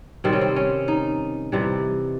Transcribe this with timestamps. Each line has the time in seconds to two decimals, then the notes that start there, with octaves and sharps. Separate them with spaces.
0.24 C3 D#3 G3 C4
0.33 C#4
0.41 C4
0.56 C#4
0.88 D#4
1.52 C3 E3 G3